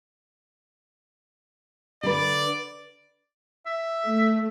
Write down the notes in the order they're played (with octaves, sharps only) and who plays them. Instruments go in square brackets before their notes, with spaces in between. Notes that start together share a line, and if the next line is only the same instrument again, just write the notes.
[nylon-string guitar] D3 A4 B4 [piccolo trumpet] D5
[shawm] E5
[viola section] A3